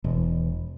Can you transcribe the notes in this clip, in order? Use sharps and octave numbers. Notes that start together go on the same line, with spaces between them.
E1